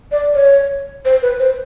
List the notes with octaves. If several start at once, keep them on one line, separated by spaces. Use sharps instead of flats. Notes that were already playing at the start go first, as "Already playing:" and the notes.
D5
C#5
C5
B4
C5